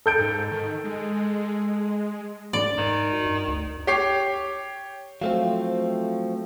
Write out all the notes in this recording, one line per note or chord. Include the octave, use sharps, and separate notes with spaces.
A4 G6 D7
G#2
D#3
G#3
G#2 D5
G#2 D#3
F#4
G2
D2
G4 C#5 C7
F3 F#3 A3 C4 F5